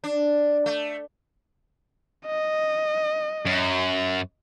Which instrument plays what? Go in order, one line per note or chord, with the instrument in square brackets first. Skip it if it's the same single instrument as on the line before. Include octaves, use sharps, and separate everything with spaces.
[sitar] D4
A3
[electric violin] D#5
[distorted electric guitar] F#2